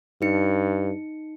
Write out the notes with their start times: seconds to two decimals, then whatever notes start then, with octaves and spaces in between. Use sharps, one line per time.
0.22 G2 D#4 C#7